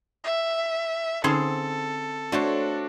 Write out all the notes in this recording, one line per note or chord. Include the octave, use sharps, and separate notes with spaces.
E5
D3 C4 C#4 D#4 G#4 A4 F5
A3 D4 F#4 C5 C#5